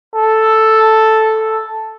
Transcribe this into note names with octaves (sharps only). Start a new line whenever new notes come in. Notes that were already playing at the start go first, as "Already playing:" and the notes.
A4